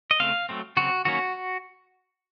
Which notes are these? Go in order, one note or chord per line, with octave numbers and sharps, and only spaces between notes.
D#5
C#3 A3 C4 F5
F#3 A3 C4
C#3 F#3 C4 F#4
D#3 F#3 A#3 C#4 F#4